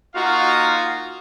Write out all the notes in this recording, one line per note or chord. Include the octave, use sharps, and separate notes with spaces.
A#3 D#4 F4 F#4 F5